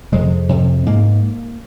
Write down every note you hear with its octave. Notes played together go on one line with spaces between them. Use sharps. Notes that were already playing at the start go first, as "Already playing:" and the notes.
F2 C3 G#3
F2 C3
G#2 A#3